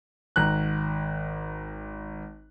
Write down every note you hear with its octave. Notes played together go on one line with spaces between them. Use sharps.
G#1 A#5 F#6